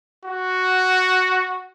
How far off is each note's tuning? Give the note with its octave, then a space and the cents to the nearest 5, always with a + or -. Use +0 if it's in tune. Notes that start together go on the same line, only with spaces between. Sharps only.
F#4 +0